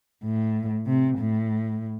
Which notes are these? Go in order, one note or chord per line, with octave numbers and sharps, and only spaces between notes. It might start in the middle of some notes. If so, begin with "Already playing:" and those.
A2
C3
A2